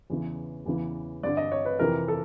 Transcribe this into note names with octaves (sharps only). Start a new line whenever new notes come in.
E2 C#3 E3
E2 C#3 E3
G2 D3 D5
D#5
C#5
B4
F2 C3 E3 A#4
A4